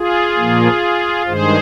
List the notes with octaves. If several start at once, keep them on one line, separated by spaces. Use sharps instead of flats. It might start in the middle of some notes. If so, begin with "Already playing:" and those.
Already playing: F4 G#4
A#2 F3 A#3
G2 D#3 G#3 G#4 C5